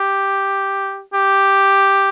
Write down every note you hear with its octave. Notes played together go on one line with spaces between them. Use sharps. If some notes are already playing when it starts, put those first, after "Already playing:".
Already playing: G4
G4